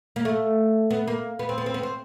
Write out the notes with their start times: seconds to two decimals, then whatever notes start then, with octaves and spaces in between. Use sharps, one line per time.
0.16 A#3
0.25 A3
0.91 B3
1.07 A#3
1.39 B3
1.49 C4
1.58 B3
1.66 C4
1.74 B3
1.83 C4